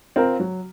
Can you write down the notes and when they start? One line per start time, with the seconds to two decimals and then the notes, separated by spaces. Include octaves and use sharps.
0.16 C4 F4 A#4
0.40 F#3